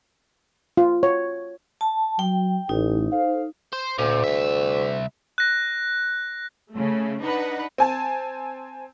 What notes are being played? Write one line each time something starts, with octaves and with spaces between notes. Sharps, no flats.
F4
C#5
A5
F#3 G5
A1 D#4
A4 C5 F5
C5
D2 A#2
C2 E5
F#6 A#6
C#3 A3
D4 D#4 B4 F#5
C4 G#5 A5